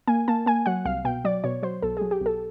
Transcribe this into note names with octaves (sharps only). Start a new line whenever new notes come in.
A#3 G#5
A#3 A5
A#3 G#5
F#3 F#5
C2 F5
B2 G5
F#3 D5
B2 C#5
F#3 C5
B1 A4
G#4
F#3
G4
B1 A4